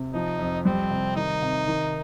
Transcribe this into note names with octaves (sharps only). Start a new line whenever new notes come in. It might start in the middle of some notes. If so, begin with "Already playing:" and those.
Already playing: C3
F3 D#4
F2
G3 C4
C3
D#3 D#4
C3
D#3